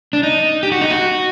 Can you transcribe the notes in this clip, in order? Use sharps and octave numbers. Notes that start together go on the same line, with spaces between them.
D4
D#4
G4
F#4
D#4
F#4